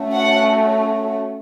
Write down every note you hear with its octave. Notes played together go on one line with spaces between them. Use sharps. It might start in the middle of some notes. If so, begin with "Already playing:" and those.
Already playing: A3 C#4 F#4
F#5